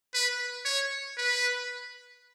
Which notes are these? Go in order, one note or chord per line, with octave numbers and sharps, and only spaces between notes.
B4
C#5
B4